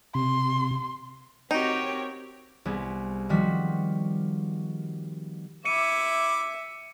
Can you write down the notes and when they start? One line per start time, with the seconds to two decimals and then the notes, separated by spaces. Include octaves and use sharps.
0.15 C3 C6
1.51 C4 D#4 F#4 G4 A#4 C#5 G5
2.65 C2 B3 G#4
3.29 D#3 F3 G3 F#4 B6
5.65 E4 E5 D6 C#7 D#7